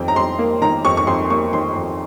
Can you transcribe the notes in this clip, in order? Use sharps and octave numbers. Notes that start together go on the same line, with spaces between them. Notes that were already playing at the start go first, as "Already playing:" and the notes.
Already playing: F2 D#3 G5
A#5
F2 C6
A#3
D#3 A#5
F2 C#6
C#6
F2 C6
A#3 C#6
D#3 C6
F2